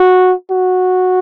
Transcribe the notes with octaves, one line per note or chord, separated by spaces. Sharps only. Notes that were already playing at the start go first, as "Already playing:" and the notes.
Already playing: F#4
F#4